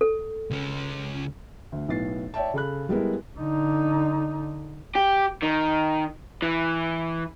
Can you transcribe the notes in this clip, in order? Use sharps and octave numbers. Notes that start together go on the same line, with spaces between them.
A4
C#2 C#4
D2
B1 A2 B3 A6 C7
C#5 D5 E5 G5 A5
C#3 A4 B5 F#6
G3 G#3 B3 E4 A#4
D3 D#4
G4
D#3
E3